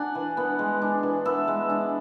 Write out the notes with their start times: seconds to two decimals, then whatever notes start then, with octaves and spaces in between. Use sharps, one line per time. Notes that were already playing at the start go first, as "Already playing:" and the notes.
Already playing: D4 F#5 G#5
0.15 E3
0.37 B3
0.59 G#3
0.82 D4
1.03 E3
1.25 B3 E5
1.48 G#3
1.70 D4